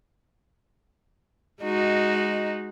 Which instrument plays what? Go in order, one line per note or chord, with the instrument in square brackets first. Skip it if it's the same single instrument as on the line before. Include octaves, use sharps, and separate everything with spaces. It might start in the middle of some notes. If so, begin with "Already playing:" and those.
[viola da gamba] G#3 D#4 F#4